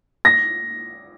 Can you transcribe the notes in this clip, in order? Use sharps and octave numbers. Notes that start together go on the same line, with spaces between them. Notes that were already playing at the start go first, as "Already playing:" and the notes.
A#6